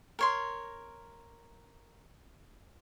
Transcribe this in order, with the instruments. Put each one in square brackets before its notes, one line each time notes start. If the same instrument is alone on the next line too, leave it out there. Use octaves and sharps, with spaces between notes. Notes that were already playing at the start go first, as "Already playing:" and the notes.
[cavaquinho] A#4 C#5 C6